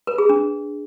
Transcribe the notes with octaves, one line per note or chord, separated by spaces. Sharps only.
B4
G#4
D4